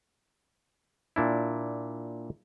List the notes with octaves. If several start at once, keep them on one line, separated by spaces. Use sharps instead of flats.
A#2 D4 E4